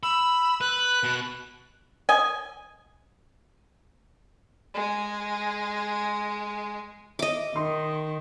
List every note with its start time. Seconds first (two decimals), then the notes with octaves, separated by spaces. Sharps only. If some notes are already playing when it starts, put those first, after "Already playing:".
0.03 B5 E6
0.61 B4 F#6
1.03 B2
2.09 D#5 G#5
4.74 G#3 G#4
7.19 D#5 E5 D6
7.56 D#3 D#4 C6